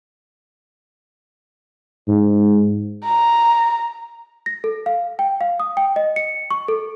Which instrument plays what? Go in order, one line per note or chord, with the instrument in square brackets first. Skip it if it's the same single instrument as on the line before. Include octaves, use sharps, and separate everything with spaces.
[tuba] G#2
[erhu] A#5
[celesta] A#6
A4
F5
G5
F5
D#6
G5
D#5
C#7
C#6
A4